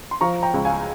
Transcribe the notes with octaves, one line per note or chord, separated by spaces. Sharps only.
C6
F3 A#5 C#6
G5 A#5
C#2
F5 G#5